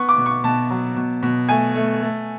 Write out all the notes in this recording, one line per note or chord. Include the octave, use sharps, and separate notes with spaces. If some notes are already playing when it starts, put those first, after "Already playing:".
Already playing: B3 C#6
D6
B2
C#6
B2 A5
F#3
B2
B2
A3 G#5
A3
A3